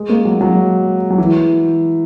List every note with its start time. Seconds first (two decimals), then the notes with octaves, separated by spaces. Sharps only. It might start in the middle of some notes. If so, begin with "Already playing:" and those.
Already playing: G#3
0.09 A#3
0.25 F#3
0.41 F#3
1.11 F#3
1.18 E3